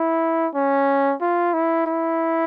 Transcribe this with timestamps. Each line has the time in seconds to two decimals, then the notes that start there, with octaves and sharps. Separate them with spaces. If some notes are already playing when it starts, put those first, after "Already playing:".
Already playing: E4
0.55 C#4
1.21 F4
1.54 E4
1.86 E4